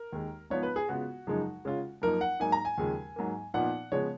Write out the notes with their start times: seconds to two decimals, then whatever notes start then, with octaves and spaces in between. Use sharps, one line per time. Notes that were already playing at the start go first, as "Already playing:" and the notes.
Already playing: A#4
0.13 D#2 D#3 G#3
0.50 G#2 F3 B3 F4 C#5
0.63 B4
0.76 G#4
0.89 C#3 G#3 B3 F4 F#4
1.27 F#2 C#3 F3 G#3 D#4
1.65 C#3 G#3 C#4 F4
2.02 F#2 F3 A#3 D#4 A#4
2.21 F#5
2.40 G#2 F#3 A#3 D#4 G#5
2.52 A#5
2.65 G#5
2.78 D#2 C#3 F3 G#3
3.16 G#2 F#3 A#3
3.54 A#2 F3 B3 D#4 F#5
3.92 C#3 F3 G#3 B3 C#5